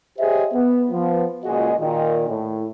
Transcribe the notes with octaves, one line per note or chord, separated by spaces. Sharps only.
G4 G#4 C5 C#5 D#5 E5
B3
F3 B3
C#2 A#2 F#4 G#4 D#5
A#2 D#3
A2